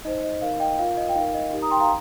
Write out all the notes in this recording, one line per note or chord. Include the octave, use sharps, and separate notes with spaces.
D#4 C5 D#5
D#5
D#4 A#4 F5
D#5 G5
F4 A#4 F5
D#5
G5
D#4 A#4 F5
D#5
D#4 G4 A#4
A#5 D#6
G5 C6
F5 A#5